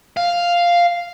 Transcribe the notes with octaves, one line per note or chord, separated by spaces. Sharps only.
F5